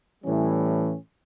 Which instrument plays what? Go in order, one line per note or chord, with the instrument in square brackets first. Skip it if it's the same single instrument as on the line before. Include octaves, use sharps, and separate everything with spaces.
[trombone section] A2 E3 G3 C#4